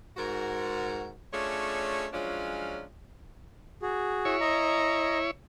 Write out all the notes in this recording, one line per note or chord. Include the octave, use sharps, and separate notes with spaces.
G#2 F#4 A#4
A3 C#4 D4 F4 G#4 C#5
F3 F#3 G#3 C#4 D4 F4
F#4 G#4
E4 C#5
D#5 A#5